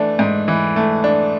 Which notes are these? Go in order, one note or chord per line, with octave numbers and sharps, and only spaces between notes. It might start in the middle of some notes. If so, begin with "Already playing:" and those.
Already playing: E3 A3 D4
G#2
E3
A3
D4